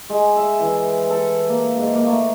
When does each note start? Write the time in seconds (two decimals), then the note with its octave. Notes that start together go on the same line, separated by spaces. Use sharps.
0.09 G#3
0.36 E5
0.60 E3
1.10 A4
1.49 A#3
1.77 G#2
1.95 A#3
2.07 A3